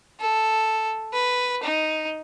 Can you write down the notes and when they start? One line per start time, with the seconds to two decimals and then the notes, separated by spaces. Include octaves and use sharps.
0.20 A4
1.13 B4
1.63 D#4